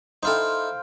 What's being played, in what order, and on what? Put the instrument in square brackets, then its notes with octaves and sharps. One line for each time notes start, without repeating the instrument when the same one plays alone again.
[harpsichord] D#4 E4 A4 [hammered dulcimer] C5 F5 G5